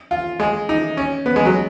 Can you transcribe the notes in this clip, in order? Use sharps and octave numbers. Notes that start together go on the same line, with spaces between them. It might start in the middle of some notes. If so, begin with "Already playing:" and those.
F4
G#3
D#4
C#4
B3
G#3
F#3